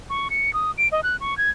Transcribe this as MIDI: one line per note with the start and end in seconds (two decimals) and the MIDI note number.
0.10 0.28 85
0.30 0.53 97
0.54 0.71 87
0.78 0.88 98
0.92 1.01 75
1.03 1.16 90
1.20 1.37 85
1.38 1.50 92